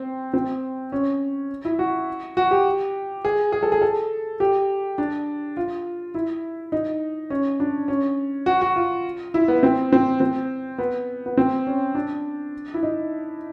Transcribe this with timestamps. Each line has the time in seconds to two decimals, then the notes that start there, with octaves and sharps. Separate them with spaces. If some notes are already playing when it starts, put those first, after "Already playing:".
Already playing: C4
0.34 C4
0.92 C#4
1.65 E4
1.79 F#4
2.37 F#4
2.51 G4
3.25 G#4
3.52 G#4
3.63 A4
3.72 G#4
3.82 A4
4.40 G4
4.98 D4
5.57 F4
6.15 E4
6.72 D#4
7.30 C#4
7.60 D4
7.88 C#4
8.46 F#4
8.62 F#4
8.76 F4
9.34 E4
9.48 B3
9.63 C4
9.92 C4
10.20 C4
10.78 B3
11.26 B3
11.37 C4
11.67 C#4
11.95 D4
12.74 E4
12.83 D#4